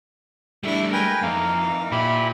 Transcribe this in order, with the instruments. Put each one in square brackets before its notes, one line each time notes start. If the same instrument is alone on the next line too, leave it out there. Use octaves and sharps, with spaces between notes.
[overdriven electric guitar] G3 A3 [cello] D4 E4
[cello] G#3 A#4 [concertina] B4 G5 G#5
[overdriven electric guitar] F2 [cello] E3 D#4 [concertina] A#3 F5
[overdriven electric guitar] A#2 [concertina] E4 G4 B5